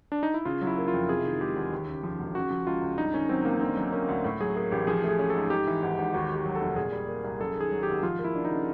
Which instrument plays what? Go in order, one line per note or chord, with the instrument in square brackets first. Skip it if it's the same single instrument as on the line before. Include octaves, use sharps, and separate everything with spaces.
[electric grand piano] D4
D#4
E4
[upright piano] C#3 [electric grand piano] F4
[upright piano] F#3
[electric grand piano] E4
[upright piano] A#3
[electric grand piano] F4
[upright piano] F2
[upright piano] C3 [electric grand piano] G#4
[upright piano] D#3
[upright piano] G#3 [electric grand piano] G4
[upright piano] E2
D#2
C#3
F3
E1
[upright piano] C#3 [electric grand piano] F#4
[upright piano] F3
[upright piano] C#2 [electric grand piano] F4
[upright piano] C#2
[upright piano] G2 [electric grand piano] D#4
[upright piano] D#3 [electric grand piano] C#4
[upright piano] F#3 [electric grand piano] C4
[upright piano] A1 [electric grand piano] A#3
[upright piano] D3 [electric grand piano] C4
[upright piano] F#3
[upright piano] A#3 [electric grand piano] C#4
[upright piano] D2
A2
[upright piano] F#3 [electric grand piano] G#4
[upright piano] A#3 [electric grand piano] G#4
[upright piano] A1 [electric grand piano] G4
[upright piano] F3 [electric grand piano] G#4
[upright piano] A3 [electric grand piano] G#4
[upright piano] C#4
[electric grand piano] A4
[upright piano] G#2
[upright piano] G#2 [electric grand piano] G4
[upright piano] E3
G#1
G#1
[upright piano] D#2 [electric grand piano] F#4
[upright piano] D#3
[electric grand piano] G4
[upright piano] F#3
[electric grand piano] A4
[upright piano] F1
[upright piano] A#2 [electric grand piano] G#4
[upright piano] G3
A#3
C2
[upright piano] F#2 [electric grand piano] A4
[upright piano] D#3 [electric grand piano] G#4
[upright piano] F#3
[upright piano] G#1 [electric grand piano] G4
[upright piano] F3 [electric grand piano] F4
[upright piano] A#3
[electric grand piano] E4
[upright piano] D4
[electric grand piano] D#4
[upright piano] C#3